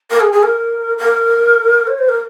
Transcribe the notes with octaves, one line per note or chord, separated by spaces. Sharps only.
A#4
G#4
G#4
A#4
A#4
C#5
C5
A#4